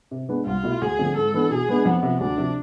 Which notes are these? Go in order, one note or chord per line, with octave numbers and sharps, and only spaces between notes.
C3
G#3 B3 D4
C2 F4
B2 A3 E4
D2 G#4
D3 F3 A3 C4
G#2 A4
E3 B3 D4
B2 G#4
G#3 B3 D4
F2 B3
C3 F3
D2 D4
C3 F3